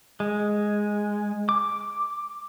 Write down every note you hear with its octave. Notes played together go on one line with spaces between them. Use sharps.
G#3
D6